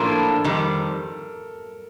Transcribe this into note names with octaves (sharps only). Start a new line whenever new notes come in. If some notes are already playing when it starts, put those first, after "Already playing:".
Already playing: A2 F3 A#3 D4 A4 A#4
F2 D#3 G3